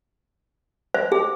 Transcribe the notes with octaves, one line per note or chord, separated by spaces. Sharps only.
C5
G#4